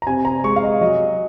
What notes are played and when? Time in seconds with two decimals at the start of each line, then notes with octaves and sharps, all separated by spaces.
0.02 A#5
0.07 C3 G#5
0.25 A#5
0.44 G#3 C#6
0.56 F5
0.63 D#5
0.81 F#3 D#5